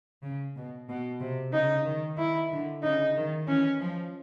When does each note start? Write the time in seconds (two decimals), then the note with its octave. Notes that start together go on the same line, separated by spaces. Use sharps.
0.23 C#3
0.56 B2
0.88 B2
1.21 C3
1.53 C#3 D#4
1.86 D#3
2.18 D#3 E4
2.50 D3
2.83 C#3 D#4
3.15 D#3
3.48 E3 C#4
3.80 F3